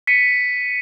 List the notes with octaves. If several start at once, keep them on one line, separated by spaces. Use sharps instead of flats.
B6 C#7 D#7